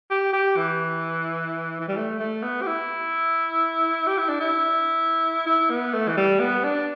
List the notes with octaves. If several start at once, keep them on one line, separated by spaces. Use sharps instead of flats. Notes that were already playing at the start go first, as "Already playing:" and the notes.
G4
G4
E3
E3
G3
A3
A3
B3
G4
E4
G4
E4
D4
E4
E4
B3
A3
E3
G3
B3
D4